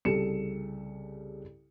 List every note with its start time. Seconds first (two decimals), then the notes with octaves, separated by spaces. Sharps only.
0.05 C2 C#3 G4 A4 C#7 E7